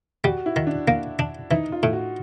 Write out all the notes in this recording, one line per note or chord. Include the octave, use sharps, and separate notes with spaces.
G3 F#4
E4
D#3
D4
A#3
D4
E3 D#4
F4
A2
F#4